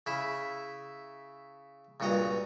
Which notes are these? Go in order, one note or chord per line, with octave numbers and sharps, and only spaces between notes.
C#3 E4 E5
C#2 G2 A#2 F#4 D#5 A#5